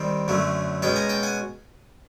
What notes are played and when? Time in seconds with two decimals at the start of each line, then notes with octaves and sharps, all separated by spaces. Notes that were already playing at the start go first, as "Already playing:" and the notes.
Already playing: D#3 G3 C4
0.28 F#2 D3 F#3 A3
0.82 B2 G#3 C#4 G5 A5
0.96 G#5 A#5
1.09 G5 A5
1.23 F#5 G#5